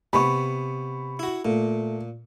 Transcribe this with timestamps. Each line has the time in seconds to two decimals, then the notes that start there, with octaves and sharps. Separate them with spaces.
0.13 C3 B3 B5 C#6
1.19 E4 F#4
1.45 A#2 A3